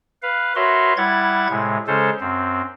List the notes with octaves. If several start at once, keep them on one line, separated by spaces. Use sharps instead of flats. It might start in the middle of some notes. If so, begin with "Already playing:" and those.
B4 F5
F#4 A#4 B4 C#5 E5 C6
G3 E4 F#5 G#6 A6
A2 C3 G#3
C#3 G#3 C#4 A4 C5
F#2 C4